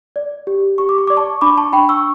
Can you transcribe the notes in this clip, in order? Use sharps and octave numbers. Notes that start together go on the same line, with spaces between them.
D5
G4
G4 C#6
D6
C#6
D5 D6
A5 C#6
D4 B5 D6
A5 C#6
D4 G5 B5
C#6 E6